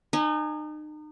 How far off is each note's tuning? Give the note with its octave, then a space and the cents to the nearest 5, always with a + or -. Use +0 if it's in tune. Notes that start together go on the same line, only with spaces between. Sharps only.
D#4 -35 G#5 +0